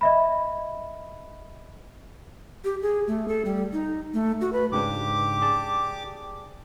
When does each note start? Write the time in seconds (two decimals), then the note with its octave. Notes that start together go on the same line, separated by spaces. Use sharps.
0.01 D#5 E5 B5
2.64 G4
2.82 G#4
3.07 A3
3.28 A4
3.45 G3
3.73 D#4
4.14 A3
4.41 F#4
4.53 B4
4.72 G#2 C#3 D4 G4 D6
5.42 G#4 D5 A5